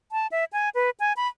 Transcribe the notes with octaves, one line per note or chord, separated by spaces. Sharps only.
A5
E5
G#5
B4
G#5
B5